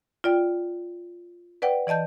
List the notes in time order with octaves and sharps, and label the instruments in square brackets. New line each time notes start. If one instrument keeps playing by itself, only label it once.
[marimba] F4 D5 G5
B4 D5 F#5 G5
E3 D5 D#5 A5 G6